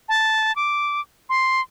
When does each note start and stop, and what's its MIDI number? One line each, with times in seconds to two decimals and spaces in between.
0.09 0.54 81
0.56 1.00 86
1.29 1.61 84